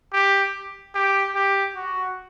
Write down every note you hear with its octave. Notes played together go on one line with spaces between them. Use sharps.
G4
G4
G4
F#4